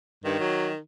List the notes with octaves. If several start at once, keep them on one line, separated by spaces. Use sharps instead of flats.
G2 D#3
F#3